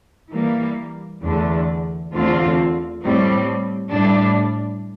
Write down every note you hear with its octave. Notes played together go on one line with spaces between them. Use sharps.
E3 G3 A#3
E2 D3 A3 D4
E2 D3 A3 C4 F4
A2 G3 C4
A2 G3 D4